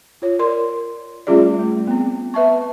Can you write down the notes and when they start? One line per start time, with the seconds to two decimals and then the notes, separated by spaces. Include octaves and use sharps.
0.22 F4 C#5
0.39 A#4 D5 C6
1.27 G3 A3 C#4 F4 G#4 D5
1.59 A3
1.87 B3 C4
2.34 B4 E5 A5 C#6